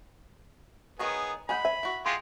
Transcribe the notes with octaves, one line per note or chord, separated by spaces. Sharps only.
D#3 B3 G#4 A#4 C#5
G#3 G#4 F#5 G#5 B5 G6
C5 E5 G#5
E4 F#4
G#3 F4 G4 C6